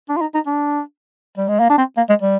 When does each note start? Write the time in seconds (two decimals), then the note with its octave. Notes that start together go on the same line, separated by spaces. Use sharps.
0.09 D4
0.17 F4
0.21 D#4
0.34 D#4
0.46 D4
1.38 G3
1.48 G#3
1.60 A#3
1.70 D4
1.78 C4
1.97 A#3
2.09 G#3
2.22 G3